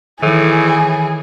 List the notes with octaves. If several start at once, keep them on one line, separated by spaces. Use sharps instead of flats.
A2 D#3 E3 G#4